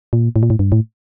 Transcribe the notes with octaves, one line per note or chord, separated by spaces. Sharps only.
A#2
A2
A#2
A2
G2
A2